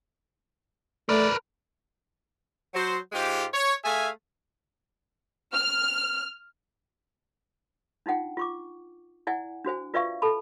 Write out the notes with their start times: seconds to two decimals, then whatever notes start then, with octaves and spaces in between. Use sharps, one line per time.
1.09 A3 A#4 B4 D5
2.74 F#3 C5
3.12 G#2 G#3 F4 G4
3.52 C#5
3.83 A3 G#4 E5 F5 G#5
5.53 F6
8.06 D4 D#4 F4 F#5 G5
8.37 F4 C#6 D6
9.27 E4 D5 F#5 G#5
9.65 D4 F#4 C5 G#5
9.94 F4 B4 D5 E5 F5 C#6
10.22 A4 A5 B5